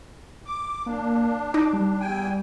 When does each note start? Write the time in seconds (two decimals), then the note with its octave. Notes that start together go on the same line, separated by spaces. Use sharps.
0.46 D6
0.86 A#3 D4
1.54 D#4 D6
1.73 G3
2.00 E2 G5 G#5